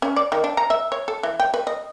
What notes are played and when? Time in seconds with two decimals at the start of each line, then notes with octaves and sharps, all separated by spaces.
0.02 C#4
0.16 D5
0.32 D#3
0.44 D4
0.57 A#5
0.70 E5
0.92 C#5
1.08 A4
1.23 E3
1.40 G5
1.54 B4
1.67 D#5